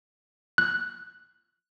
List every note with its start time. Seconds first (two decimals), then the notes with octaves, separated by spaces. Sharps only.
0.58 F#6